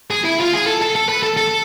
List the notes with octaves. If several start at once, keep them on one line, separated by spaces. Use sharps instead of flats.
G#4
E4
F4
G#4
A4
A4
A4
B4
A4
A4